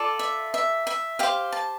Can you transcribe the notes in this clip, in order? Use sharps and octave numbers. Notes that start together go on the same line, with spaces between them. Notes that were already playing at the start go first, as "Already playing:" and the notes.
Already playing: F4 A4 D5
E5
E5
E5
G4 C5 F5
A5